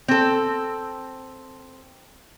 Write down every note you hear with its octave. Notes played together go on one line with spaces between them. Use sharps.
C4 A4